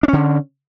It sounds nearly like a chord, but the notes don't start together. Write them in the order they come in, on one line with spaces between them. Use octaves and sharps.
D4 C#4 D3